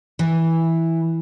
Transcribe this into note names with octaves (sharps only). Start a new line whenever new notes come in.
E3